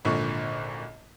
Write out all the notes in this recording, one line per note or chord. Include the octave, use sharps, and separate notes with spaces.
G#1 A#2 D3 C#6